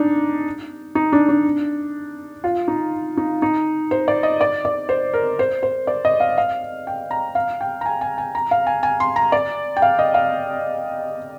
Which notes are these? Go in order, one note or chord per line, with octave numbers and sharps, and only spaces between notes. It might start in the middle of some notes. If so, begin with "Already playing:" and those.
Already playing: D4 D#4
D#4
D4
D4
F4
D#4
D#4
D#4
C5
D5
D#5
D5
D5
C5
A#4
C5
C5
D5
D#5
F5
F5
G5
A#5
F5
G5
A#5
G#5
G#5
G#5
A#5
F5
G#5
G#5
C6
A#5
D5
G5
F5
D#5
F5